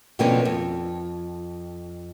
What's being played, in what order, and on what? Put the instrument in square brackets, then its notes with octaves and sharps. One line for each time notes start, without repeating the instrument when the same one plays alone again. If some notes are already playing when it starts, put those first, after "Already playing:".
[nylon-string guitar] B2 D3 F3 A#3 C4 C#4
F2